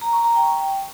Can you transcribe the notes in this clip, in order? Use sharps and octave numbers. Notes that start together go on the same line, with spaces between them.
A#5
C#6
A#5
G5